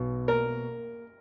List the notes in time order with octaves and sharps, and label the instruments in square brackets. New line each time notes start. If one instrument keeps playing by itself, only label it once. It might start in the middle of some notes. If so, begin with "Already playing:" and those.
Already playing: [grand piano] B1 B2
[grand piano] A#3 [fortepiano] A#4